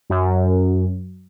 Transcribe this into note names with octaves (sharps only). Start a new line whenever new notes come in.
F#2